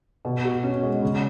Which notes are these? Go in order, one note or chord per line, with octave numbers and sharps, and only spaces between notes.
B2
F#4
C#4
G#3
C#3